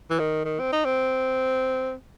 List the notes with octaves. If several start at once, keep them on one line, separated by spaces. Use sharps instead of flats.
E3
D#3
D#3
C4
D#4
C4